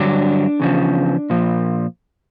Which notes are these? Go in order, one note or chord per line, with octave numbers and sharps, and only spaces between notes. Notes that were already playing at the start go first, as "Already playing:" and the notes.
Already playing: G2 D3 F#3 D4
E2 C#3 F3
A#2 F3